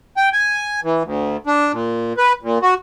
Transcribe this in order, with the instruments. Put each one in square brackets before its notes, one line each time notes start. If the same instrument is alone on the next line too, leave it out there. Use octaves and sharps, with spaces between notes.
[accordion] G5
G#5
E3
D2
D4
A#2
B4
A#2
F#4